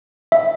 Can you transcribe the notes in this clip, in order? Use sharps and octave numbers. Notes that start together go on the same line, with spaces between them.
E5